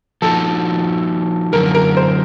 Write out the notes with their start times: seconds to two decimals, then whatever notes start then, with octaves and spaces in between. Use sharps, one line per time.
0.22 F3 A#3 D#4 F#4 A4
1.53 F#2 D3 F#3 A#4
1.74 A#4
1.97 C5